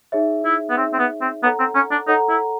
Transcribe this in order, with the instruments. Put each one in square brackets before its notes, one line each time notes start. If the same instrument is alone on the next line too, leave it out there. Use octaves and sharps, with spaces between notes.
[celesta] D#4 G#4 C#5 E5
[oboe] E4
B3
[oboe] C4 [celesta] D#4 G#4 C#5 E5
[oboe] C4
B3
C4
[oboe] B3 [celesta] A4 C#5 F#5 A#5
[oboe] C4
C#4
D4
[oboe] D#4 [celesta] A4 C#5 F#5 A#5
[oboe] E4